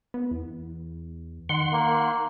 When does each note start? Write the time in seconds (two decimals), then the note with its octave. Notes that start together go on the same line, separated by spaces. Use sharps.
0.14 B3
0.31 E2
1.49 D#3 F#5 C6
1.73 A#3